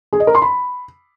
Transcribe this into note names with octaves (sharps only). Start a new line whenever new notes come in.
G#4
D#5
A#4
C6
B5